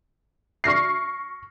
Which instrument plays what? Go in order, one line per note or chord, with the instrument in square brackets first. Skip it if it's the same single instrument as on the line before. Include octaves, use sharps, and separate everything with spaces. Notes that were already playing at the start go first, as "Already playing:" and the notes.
[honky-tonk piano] C#6 F6 A#6 C7